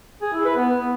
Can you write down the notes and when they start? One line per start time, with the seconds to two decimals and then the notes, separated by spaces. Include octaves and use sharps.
0.22 G#4
0.33 E4
0.45 B4
0.57 B3